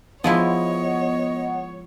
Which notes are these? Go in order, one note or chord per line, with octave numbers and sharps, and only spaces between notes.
F3 G#3 B3 E4 C#5 D#5